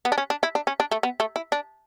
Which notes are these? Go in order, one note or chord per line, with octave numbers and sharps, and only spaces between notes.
B3
D4
C#4
D4
E4
D4
C#4
D4
A3
B3
A3
E4
D4